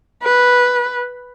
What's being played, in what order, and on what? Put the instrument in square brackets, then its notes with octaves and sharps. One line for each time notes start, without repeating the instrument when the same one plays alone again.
[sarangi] B4